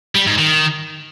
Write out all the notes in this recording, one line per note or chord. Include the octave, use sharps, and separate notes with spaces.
G3
G#2
D#3